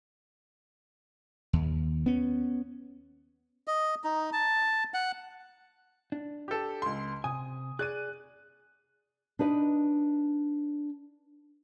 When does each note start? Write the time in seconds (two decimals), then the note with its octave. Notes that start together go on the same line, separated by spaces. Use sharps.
1.53 D#2
2.06 B3 C#4
3.68 D#5
4.04 D#4
4.33 A5
4.94 F#5
6.12 D4
6.48 G4 A4
6.82 C#2 C6
7.24 C3 G#5 D#6
7.79 G#4 D5 F#6 D#7
9.39 D4 D#4 B4 D#5